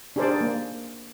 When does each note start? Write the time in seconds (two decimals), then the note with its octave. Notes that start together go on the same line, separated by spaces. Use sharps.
0.16 D4 G4 G#4 A#4 C5 D5
0.41 A#3